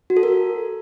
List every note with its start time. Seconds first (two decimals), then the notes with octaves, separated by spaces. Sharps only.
0.10 F#4
0.17 A4
0.23 A#4